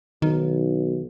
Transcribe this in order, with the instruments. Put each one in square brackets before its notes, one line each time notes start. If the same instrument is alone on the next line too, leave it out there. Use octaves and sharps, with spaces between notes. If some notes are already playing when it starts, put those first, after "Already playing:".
[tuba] B1 [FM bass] D#3